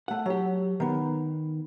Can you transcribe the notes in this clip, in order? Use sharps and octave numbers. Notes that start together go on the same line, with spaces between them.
A3 F#5
F#3 G4
D#3 B3